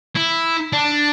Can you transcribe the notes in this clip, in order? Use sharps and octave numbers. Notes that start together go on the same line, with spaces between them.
E4
D4